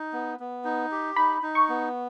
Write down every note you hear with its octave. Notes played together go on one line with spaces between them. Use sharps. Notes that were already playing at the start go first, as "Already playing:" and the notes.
Already playing: D#4
B3
B3
D#4
G4
D#4 B5
D#4
C#6
B3